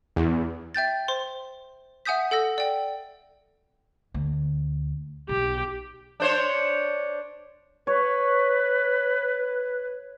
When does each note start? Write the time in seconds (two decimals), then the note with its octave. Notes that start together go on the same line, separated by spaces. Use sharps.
0.16 E2
0.74 E5 G5 G6 A6
1.08 C5 C6
2.05 E5 F#5 G#5 D#6 G6 B6
2.31 A4 F#5 E6 A#6
2.58 D5 G5
4.14 D2
5.29 B1 G4
6.20 D4 C5 C#5
7.87 B4 C#5